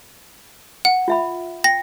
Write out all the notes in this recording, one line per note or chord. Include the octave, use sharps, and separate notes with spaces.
F#5
F4 E5 B5
G5 A#6